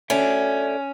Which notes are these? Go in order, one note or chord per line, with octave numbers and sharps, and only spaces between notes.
C#4 A4 D5 E5